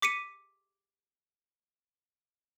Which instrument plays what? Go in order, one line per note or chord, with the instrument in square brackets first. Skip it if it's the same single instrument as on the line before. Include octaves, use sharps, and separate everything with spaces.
[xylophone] D6 B6 C#7 D#7